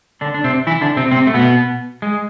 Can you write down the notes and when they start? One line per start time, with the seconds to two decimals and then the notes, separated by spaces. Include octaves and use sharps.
0.21 D3 D4
0.34 D4
0.44 C3 C4
0.67 E3 E4
0.81 D3 D4
0.97 C3 C4
1.11 C3 C4
1.27 A3
1.34 B2 B3
2.02 G#3